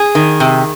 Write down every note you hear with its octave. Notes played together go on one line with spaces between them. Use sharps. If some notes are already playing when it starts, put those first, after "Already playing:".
Already playing: G#4
D#3
C3